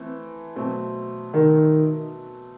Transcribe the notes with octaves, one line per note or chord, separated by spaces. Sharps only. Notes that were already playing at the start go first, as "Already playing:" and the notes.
Already playing: E3 A3 C4
B2 F#3 A3 C4
D#3